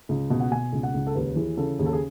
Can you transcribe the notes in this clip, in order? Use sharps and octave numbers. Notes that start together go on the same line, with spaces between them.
C#2
B2
F#5
B2 G#5
C#2
F#5
C#2
A4
D#2 B4
E3 G#4
C#3 A4
D#2 G#4
A4
G#4